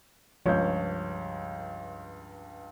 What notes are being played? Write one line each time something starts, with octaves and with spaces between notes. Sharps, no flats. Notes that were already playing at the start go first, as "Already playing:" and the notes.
C#2 G2 F3 C#5 G6